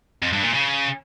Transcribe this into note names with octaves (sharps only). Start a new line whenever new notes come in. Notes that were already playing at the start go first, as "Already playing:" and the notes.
F2
G2
A#2
C#3